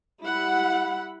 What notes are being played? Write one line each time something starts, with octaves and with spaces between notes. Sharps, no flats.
G3 E4 F#5 B5